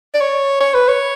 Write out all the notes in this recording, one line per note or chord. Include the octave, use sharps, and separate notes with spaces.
D5
C#5
C#5
B4
C#5